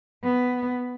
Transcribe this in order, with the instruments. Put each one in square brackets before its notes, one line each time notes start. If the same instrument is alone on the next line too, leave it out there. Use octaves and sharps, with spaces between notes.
[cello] B3